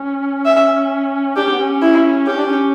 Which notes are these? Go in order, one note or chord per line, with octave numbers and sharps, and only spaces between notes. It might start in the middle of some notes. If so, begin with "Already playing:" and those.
Already playing: C#4
E5
D4 G4
C#4
B3
C#4
E4
C#4 G4
D4
C#4